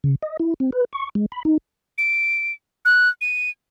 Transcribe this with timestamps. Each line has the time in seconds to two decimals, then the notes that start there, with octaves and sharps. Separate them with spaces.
0.04 C#3
0.23 D#5
0.40 E4
0.60 C4
0.72 B4
0.93 C#6
1.15 G#3
1.32 B5
1.45 D#4
1.98 D7
2.85 F#6
3.21 D#7